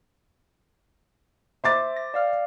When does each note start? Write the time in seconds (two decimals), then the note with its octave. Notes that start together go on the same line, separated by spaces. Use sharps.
1.64 C5 E5 D6 A6
1.96 A#6
2.14 D5 F5 F6